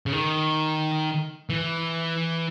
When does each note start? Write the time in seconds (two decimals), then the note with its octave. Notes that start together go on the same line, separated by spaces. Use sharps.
0.06 C#3
0.12 D#3
1.50 E3